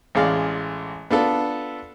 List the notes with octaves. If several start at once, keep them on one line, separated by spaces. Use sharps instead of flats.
A1 G#3 D5 F5
B3 D4 F4 A4